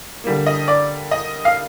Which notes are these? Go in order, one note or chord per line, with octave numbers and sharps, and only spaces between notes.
D3 G3 A#3
D#5
D5
D#5
F5